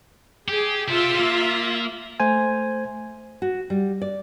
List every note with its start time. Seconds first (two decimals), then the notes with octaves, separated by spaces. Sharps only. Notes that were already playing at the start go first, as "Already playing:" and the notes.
0.48 G4 G#4
0.88 F4 G4 C5 E5
1.19 A#3
2.20 A3 C5 G#5
3.42 F#4
3.70 G3
4.02 D5